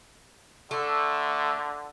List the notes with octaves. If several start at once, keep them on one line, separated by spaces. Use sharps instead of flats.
D3 A3